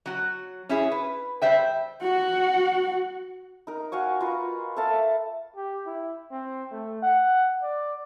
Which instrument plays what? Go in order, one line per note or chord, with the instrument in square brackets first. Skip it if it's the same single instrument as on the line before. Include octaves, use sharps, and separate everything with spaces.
[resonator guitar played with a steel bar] F#3 F#4
C#4 E4 G#4
B4
G3 C5 E5 G5
[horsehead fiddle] F#4 F#5
[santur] D#4 A#4
F#4 F5 G#5 C#6
F4 A#4 B4
A4 E5 F5 A5
[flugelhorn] G4
E4
C4
A3
F#5
D5